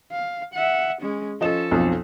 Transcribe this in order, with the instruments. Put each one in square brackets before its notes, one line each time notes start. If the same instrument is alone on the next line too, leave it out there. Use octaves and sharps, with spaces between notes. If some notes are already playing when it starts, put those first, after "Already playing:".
[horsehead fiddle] F5
E5 F#5
G#3 C#4
[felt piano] F3 D#5 E7 [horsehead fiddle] C#4 A4
[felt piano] B1 F2 F3